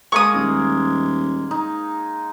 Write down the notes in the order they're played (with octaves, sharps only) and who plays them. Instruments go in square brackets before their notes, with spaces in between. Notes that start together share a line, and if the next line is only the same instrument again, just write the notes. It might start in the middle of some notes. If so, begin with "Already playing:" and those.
[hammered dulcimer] G#3 A#3 [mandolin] C#6 D#6
[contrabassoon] D#1
[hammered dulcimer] D#4